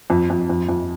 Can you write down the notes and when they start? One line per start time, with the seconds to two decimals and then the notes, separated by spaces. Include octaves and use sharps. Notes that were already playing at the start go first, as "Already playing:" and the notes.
0.10 F2
0.30 F2
0.49 F2
0.69 F2